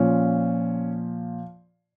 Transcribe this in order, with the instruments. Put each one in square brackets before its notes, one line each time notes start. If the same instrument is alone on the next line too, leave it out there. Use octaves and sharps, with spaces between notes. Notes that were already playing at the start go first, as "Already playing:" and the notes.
Already playing: [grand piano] A#2 F3 C#4